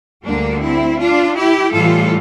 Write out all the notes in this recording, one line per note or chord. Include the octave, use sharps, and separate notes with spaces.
D2 D3 G3 A#3 D4
C4 E4
D4 F4
E4 G4
A2 E3 G3 F4 A4